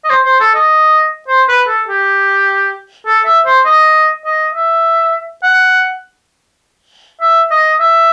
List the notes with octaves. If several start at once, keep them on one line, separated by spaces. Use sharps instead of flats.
D#5
C5
C5
A4
D#5
C5
B4
A4
G4
A4
E5
C5
D#5
D#5
E5
F#5
E5
D#5
E5